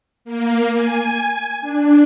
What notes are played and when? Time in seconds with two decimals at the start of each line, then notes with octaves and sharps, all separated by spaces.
0.25 A#3
0.73 G#5
1.61 D4